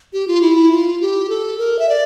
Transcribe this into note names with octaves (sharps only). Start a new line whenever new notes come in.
G4
F4
E4
F4
G4
A4
A#4
E5
D5